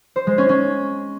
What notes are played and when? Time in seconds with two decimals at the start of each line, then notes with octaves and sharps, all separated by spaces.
0.16 C5
0.27 G#3
0.38 C#4
0.49 C#4